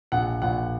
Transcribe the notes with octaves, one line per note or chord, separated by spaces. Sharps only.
A#1 F#5
A#1 F#5